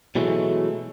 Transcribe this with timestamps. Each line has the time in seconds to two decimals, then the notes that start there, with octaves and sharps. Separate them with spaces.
0.15 B2 E3 F#3 G#3 A3